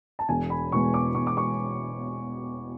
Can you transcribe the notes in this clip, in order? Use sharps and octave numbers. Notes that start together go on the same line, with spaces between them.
A5
E1 G#5
B5
E2 B2 G#3 B3 C#6
D6
E1 C#6
D6
C#6